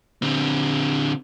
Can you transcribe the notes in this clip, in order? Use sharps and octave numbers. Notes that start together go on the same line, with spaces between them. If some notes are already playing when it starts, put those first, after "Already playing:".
D3 C4